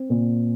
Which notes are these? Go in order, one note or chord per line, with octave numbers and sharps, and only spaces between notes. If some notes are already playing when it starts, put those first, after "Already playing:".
Already playing: C4
A#2